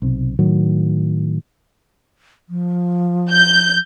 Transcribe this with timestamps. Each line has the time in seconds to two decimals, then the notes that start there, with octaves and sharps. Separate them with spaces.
0.02 B1 C3
0.39 A2 D#3 F#3
2.49 F3
3.31 G6